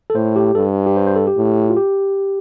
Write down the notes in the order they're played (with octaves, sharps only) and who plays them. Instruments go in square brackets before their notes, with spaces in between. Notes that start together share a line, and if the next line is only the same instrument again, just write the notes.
[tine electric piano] A4
[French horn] A2 [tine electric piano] C5
[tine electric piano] G4
[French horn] G2 [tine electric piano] A4
[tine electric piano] G4
C5
C5
A4
G4
[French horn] A2
[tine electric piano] F4
G4